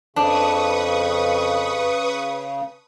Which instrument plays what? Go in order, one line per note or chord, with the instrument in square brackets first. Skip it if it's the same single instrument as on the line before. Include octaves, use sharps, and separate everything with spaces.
[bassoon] F2 [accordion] C#3 [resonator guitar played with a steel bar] D4 [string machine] B4 C#6 D#6